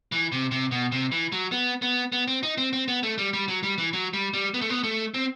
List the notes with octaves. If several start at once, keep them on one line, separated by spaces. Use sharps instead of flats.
E3
C3
C3
B2
C3
E3
F#3
B3
B3
B3
C4
D#4
C4
C4
B3
A3
G3
G3
F#3
G3
E3
F#3
G3
G3
B3
A3
B3
A3
C4